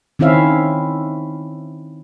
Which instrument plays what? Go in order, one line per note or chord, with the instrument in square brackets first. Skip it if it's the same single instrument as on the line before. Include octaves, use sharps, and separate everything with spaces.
[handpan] D#3 C4 C#4 E4 E5 F5